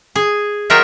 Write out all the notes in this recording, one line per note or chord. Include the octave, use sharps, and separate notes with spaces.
G#4 G#5
F#3 D#4 F4 A#4 E5 G5